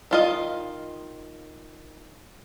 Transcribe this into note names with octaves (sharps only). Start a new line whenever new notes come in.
D#3 F4 D#5